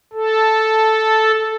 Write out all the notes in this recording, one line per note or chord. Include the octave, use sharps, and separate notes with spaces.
A4